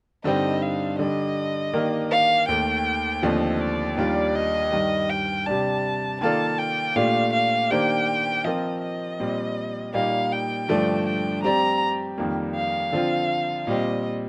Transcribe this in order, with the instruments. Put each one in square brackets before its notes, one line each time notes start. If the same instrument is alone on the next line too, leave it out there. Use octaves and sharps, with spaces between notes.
[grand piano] G2 D3 G3 C4 D#4 [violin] D#5
[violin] F5
[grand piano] D3 G3 D4 [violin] D#5
[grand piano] D#3 A#3 D4 G4 A#4
[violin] F5
[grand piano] D#2 D#3 A3 [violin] G5
[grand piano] D#2 D3 F3 A3 C4 [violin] D#5
[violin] D5
[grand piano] D#2 D#3 G3 D4 F4 [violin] D5
[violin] D#5
[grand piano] G2 D#3 G3
[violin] G5
[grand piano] C3 G3 D4 [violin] A5
[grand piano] D#3 A#3 F4 A4 D5 [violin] A5
[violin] G5
[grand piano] A#2 A3 D4 G4 [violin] F5
[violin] F5
[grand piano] D#3 A#3 D4 G4 C5 [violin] G5
[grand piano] F3 C4 F4 A#4 [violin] D#5
[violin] D#5
[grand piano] A#2 G3 C4
[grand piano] A#2 G3 A#3 D#4 [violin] F5
[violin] G5
[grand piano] G2 D3 F3 A3 D4
[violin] G5
[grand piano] G3 C4 G4 D5 [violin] A#5
[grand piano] F2 D#3 G3 A#3
[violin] F5
[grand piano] D3 F3 C4 F4
[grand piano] A#2 G3 C4 [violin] D#5